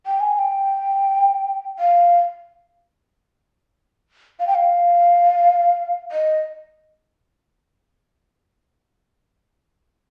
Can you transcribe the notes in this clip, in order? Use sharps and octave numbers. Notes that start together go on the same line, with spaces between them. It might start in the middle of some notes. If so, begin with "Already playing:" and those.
G5
G#5
G#5
G5
F5
F5
G5
F5
D#5